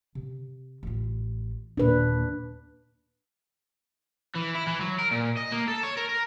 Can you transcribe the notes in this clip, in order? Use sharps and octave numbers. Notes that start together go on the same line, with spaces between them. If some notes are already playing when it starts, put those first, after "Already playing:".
C3
A1 F4
D#2 A#2 D4 B4
E3
E4
E3
F#3
A#4
A#2
D#5
A#3
A4
C#5
A#4
A#4